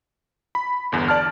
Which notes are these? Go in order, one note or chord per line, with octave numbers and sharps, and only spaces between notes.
B5
G1 E2
D5 A5 F6